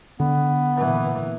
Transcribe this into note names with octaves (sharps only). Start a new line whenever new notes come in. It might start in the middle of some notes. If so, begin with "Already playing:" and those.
D3 B3
A#2 E3